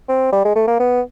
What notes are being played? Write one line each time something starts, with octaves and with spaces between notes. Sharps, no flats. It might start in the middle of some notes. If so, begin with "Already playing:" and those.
C4
G3
G#3
A3
A#3
B3